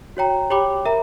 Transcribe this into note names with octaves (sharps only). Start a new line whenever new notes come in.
F#4 C#5 G5 A#5
G4 C#5 G5 B5 D6
A#4 E5 A#5